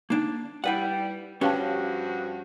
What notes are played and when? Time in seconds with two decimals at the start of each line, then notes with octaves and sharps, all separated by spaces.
0.10 A#3 D4 D#4
0.64 G3 E4 B4 F#5
1.41 G2 F3 C#4 F#4 G4 B4 F5 A5